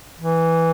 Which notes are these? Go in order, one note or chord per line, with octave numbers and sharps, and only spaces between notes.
E3